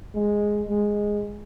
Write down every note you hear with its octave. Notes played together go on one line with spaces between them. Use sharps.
G#3
G#3